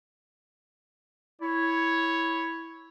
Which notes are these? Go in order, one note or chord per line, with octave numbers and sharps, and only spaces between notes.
E4 C#5